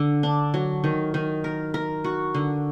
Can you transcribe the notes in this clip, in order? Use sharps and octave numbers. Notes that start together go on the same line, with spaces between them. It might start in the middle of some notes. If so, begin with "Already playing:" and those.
Already playing: D3
D4
F#3
D#3
D#3
A#4
A#4
F#4
D3